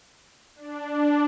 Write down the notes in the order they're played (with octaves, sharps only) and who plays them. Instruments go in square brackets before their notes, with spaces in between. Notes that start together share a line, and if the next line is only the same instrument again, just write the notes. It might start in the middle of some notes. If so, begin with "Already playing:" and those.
[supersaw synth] D4